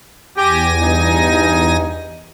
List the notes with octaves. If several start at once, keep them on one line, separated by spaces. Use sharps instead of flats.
E2 G4 G#5 A#6
G2 D#4